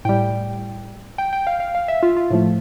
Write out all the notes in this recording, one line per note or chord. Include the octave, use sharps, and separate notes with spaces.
A2 G3 G5
G5
G5
F5
F5
F5
E5
F4
F4
A2 F3 A3